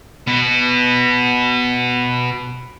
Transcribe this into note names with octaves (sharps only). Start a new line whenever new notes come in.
B2 B3